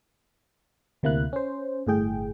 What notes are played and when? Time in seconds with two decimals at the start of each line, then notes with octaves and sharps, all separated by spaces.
1.03 D2 C3 A#3 E4 F#6
1.33 C#4 C5
1.87 G1 A2 G#4 G5